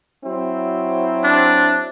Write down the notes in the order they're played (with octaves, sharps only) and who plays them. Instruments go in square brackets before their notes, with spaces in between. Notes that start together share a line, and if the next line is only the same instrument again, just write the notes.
[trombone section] F#3 C4 E4
[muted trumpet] D4